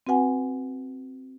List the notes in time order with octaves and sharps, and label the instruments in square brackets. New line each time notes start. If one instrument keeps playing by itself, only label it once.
[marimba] C4 F#4 B4 F#5 G#5